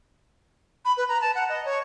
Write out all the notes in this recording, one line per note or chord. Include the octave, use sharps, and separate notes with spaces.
B5
B4
A#5
A5
F#5
D#5
C#5